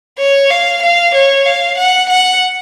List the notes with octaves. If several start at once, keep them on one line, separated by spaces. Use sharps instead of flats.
C#5
F5
F5
C#5
F5
F#5
F#5